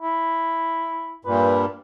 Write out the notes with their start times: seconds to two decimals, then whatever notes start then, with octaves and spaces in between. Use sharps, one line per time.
0.02 E4
1.25 G2 A#2 B4